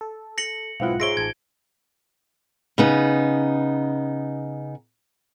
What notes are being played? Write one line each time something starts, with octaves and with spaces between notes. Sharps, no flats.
A4
A#6 C#7 F#7
B1 G#2 B3 C4 E4 F4 F5 F#5
G#2 C#5 E5 C6 A#6 D7 G7
A1 A5 G#6
C#3 B3 D#4